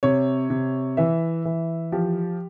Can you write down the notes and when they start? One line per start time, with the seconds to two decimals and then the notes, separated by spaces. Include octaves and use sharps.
0.03 C3 C#5
0.50 C3
0.97 E3 E5
1.45 E3
1.92 F3 G4